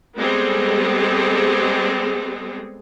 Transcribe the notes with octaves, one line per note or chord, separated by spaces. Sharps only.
G3 G#3 B3 C4 G#4 A4